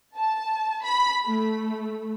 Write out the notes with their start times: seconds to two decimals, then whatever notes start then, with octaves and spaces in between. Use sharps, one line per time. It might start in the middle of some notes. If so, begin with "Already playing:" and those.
0.16 A5
0.84 B5
1.25 A3